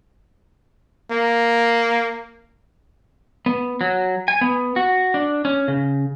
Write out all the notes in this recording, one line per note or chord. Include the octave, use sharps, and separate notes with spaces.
A#3
B3
F#3
G#5
B3
F#4
D4
C#4
C#3